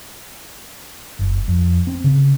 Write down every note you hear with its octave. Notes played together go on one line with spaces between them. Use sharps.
F#1
F2
C4
C#3